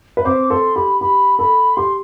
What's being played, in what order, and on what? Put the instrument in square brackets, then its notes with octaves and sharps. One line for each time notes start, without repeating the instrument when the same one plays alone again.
[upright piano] B4
[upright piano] C4 C5 [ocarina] D6
[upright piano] A4 [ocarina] C6
[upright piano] G4 [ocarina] B5
[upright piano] G4 [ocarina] B5
[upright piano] A4 [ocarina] B5
[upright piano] G4 [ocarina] C6